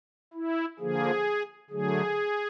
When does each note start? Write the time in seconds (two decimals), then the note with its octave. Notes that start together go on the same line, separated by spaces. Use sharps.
0.34 E4
0.79 D3 F3 A#3 G#4
1.70 D3 F#3 A3 G#4